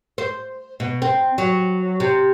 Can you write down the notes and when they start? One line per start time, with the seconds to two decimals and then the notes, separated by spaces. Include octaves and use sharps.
0.18 C5
0.80 B2
1.02 C4
1.38 F#3
2.00 C3